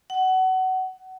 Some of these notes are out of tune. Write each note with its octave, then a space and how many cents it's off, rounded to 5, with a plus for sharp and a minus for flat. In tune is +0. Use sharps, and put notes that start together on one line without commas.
F#5 +25